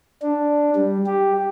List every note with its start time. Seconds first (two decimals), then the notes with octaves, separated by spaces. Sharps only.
0.22 D4
0.76 G3
1.06 G4